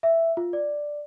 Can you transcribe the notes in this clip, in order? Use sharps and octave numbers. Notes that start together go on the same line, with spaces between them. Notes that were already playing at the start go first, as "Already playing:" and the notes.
E5
F4
D5